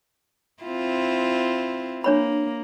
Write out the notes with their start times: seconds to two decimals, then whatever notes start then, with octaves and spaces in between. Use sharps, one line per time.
0.63 C4 E4 F4
2.04 A#3 D4 C#5 B5